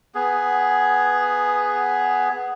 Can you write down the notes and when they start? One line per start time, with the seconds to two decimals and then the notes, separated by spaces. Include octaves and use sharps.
0.15 B3 G#4